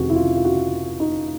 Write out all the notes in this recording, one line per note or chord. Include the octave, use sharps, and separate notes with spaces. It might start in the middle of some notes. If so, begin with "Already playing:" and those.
Already playing: F1 F2 C3 D#3 F#4 G#4
E4
F4
F4
F#4
D#4